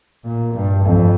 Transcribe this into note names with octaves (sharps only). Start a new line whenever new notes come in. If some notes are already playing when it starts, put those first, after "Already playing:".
A#2
G2
F2